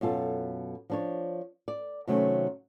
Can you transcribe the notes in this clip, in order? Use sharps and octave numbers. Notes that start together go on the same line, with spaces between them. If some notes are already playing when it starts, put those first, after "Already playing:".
F#2 B2 F4 A4
F3 D4 C#5
D5
C3 D#3 F#3 A3 C#4